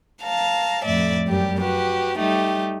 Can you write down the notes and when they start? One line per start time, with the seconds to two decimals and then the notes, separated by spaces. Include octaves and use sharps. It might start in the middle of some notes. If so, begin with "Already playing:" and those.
0.23 F5 A5 A#5
0.85 F2 A2 D5 E5
1.27 F#2 G3 G4
1.61 F#4 G4 B4
2.19 G3 A3 D#4 G4